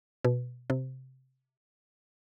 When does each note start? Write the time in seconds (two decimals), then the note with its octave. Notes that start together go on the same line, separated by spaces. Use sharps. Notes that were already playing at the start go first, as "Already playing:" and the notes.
0.25 B2
0.70 C3